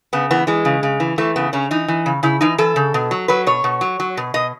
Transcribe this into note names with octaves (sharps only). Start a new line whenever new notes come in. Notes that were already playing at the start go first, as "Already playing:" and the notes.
C#3 B3
E3 B3
E3 G#3
C#3
C#3
E3
E3 A3
C#3 B3
C#3 C#4
E3 D#4
E3
C#3
C#3 E4
E3 D#4
E3 A4
C#3
B2
F#3
F#3 B4
B2 C#5
B2
F#3
F#3
B2
B2 D#5